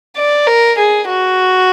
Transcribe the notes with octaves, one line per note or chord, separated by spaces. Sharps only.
D5
A#4
G#4
F#4